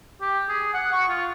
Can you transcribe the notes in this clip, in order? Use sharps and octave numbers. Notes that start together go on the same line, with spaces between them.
G4
G#4
F#5
C#6
F4